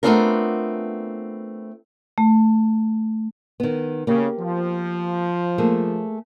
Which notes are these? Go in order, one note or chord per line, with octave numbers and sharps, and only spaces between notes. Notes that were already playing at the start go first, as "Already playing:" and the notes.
A3 B3 C4 D4 F4 A#4
A3
D#3 B3
C#3 A#3 G4
F3
A3 A#3 G#4